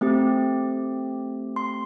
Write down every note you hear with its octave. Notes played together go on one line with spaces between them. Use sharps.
A3 C4 G4
C6